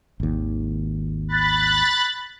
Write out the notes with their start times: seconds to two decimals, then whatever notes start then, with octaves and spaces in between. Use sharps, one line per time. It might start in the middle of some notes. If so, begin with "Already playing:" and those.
0.20 G#1 D#2
1.28 B5 F#6 A6